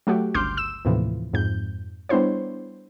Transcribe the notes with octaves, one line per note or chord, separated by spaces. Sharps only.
F#3 A3 F#4 G4
G1 C#2 C6 D6 F6 G6
E6 E7
D#2 A2 C3 E3 F3
F2 G#2 G6
G3 B3 D4 E4 C5 C#5